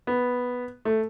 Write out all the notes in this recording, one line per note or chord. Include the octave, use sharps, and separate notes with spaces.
B3
A3